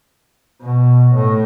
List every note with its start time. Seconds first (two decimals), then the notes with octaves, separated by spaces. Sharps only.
0.62 B2
1.15 A2